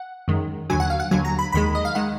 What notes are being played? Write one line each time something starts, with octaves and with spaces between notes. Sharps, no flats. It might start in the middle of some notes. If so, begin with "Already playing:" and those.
Already playing: F#5
F#2 D#3 G#3
D#2 D3 F#3 G#5
F#5
F5
F#5
D#2 D3 F#3 G#5
A#5
B5
D#2 D#3 G#3 B5
D#5
F5
D#3 G#3 F#5